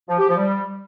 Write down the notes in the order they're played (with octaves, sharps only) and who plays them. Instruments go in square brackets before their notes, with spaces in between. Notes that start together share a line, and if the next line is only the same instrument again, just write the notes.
[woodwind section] F3
G4
F3
G3